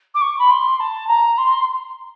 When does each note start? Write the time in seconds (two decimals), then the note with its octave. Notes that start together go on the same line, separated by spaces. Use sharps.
0.14 D6
0.21 C#6
0.38 B5
0.50 C6
0.79 A5
1.07 A#5
1.37 C6